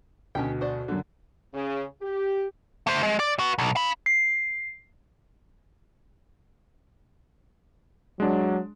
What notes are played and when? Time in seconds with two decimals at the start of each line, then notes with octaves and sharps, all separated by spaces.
0.35 D2 B2 C#4 G4 G5
0.61 F#4 C5 D5
0.88 F#2 D3
1.54 C#3
2.02 G4
2.87 A3 C5
3.03 G#3
3.20 D5
3.39 F#4 B4
3.58 B1
3.76 F5 B5
4.06 C7
8.20 F#3 G#3 D4